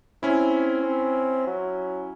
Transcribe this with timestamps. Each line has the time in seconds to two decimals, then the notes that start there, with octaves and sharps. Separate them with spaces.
0.23 C4 C#4 E4
0.83 C4
1.47 F#3